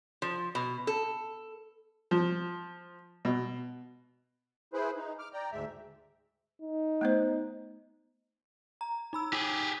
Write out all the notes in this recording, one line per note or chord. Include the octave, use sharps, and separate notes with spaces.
F3
B2
A4
F3
B2
E4 G#4 B4 C5
D#4
D6 F6
D5 G5 A#5
D2 G#2 G#3 E5
D#4
A3 B3 C5
A#5
D#4 B5 E6
D#4 G4 G#4